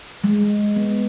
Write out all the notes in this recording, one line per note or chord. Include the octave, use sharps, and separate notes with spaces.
G#3
B3